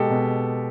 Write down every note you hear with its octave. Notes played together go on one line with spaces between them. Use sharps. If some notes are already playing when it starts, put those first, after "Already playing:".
Already playing: B2 G#3 G4 A4
B2